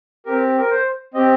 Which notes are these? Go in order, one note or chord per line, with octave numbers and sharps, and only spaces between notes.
C4 G4 A#4
A#4
C5
C4 G4 D#5